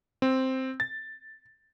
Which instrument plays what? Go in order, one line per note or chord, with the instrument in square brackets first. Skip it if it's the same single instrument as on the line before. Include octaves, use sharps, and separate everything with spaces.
[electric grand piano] C4
A6